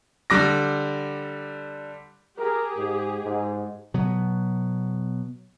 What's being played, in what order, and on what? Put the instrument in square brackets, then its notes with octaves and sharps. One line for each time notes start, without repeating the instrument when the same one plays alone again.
[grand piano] D3 G3 D6 A#6
[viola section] G4 G#4 [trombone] A#4
[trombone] G#2
G#2
[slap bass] B2 F#3 B3